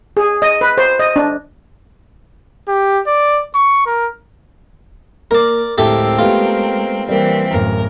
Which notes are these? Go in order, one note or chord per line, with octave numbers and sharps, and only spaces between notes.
G#4
D#5
B4
C5
D#5
D4
G4
D5
C#6
A#4
A#3 A#4 D5
D1 G#3 C4 E4 G4 A4 A#4 E5
A3 B3 F4 G4
E3 G3 A#3 C4
D1 F#2 A#4